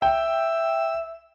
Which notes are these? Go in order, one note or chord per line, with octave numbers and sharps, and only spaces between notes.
E5 G5